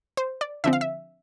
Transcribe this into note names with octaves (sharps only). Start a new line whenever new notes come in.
C5
D5
D3 F3 C4 E5
F5
E5